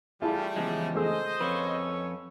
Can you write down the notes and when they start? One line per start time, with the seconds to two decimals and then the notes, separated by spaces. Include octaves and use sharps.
0.22 E3 G3 A3 E4 F4 G#4 A5
0.56 E2 C#3 F3 G#3
0.95 A3 G#4 C5 D#5 E6
1.40 F2 C#4 A4 B4 C#5